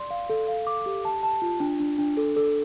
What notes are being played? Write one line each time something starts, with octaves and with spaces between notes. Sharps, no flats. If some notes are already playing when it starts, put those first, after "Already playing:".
Already playing: D5 C6
F5
A4
F5
D6
G4
A5
A5
F4
D4
D4
D4
A4
A4